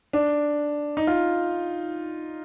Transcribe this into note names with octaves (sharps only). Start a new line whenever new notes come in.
D4
D#4
F4